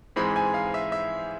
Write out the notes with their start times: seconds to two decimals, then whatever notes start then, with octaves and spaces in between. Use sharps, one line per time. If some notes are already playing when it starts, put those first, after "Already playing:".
0.16 G#2 E3 G#3 C4 B5
0.36 G#5
0.54 F5
0.74 E5
0.92 E5